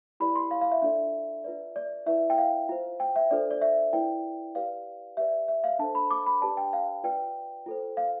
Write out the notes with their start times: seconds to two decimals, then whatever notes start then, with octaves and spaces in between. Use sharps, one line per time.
0.20 E4 G4 B4 D5 B5
0.36 C6
0.51 F5
0.61 F5
0.72 E5
0.82 D4 F4 A4 D5 E5
1.44 F4 B4 D5
1.76 D5
2.06 E4 B4 D5 E5
2.30 G5
2.38 F5
2.69 F4 C5
3.00 G5
3.16 E5
3.31 D4 F4 A4 C5 D5
3.51 D5
3.62 E5
3.93 E4 B4 D5 G5
4.55 G4 B4 D5 F5
5.17 G4 B4 D5 E5
5.48 E5
5.64 F5
5.79 D4 A4 C5 A5
5.95 B5
6.11 D6
6.26 B5
6.42 D4 G4 B4 D5 A5
6.57 G5
6.73 F5
7.04 F4 B4 D5 G5
7.66 F4 A4 C5
7.97 F5